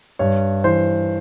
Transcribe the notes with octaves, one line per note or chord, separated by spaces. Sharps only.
G2 C#5
E3 C5